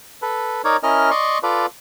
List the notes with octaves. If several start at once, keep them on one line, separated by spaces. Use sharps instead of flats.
A4 B4
D#4 A#4 C#5 D5
C#4 E4 A#4 D#5 F6
D5 D#5 C6 C#6
F4 A4 B4 D5